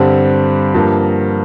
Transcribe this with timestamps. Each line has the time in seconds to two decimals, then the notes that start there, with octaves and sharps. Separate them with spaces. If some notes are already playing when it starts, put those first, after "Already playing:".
Already playing: G2 D3 G3 C4
0.74 G2 F3 A#3